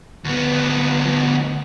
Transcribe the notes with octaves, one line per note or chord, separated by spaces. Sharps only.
D2 B3